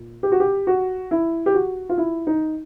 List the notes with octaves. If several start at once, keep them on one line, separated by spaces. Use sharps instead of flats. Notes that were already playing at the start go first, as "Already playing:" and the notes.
Already playing: A#2
G4
F#4
G4
F#4
E4
G4
F#4
F4
E4
D#4